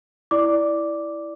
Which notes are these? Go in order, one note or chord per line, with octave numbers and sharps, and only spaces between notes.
E4 D5 D6